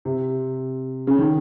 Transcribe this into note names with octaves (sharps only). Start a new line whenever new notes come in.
C3
C#3
D#3